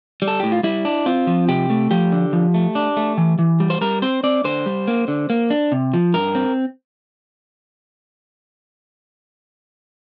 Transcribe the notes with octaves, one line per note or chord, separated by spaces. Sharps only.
G3
A4
A2 G4
F4
G3 E4
D4
C4 F4
F3
C3 G4
A3
F3 G4
D3
F3
A3
D4
A3
E3
E3
G3
C5
G3 A#4
C4 C5
C4 D5
D3 C5
G3
A#3
D3
A#3
D4
C3
F3
G2 A#4
C4